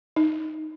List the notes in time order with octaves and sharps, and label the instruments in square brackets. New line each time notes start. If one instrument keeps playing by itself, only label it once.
[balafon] D#4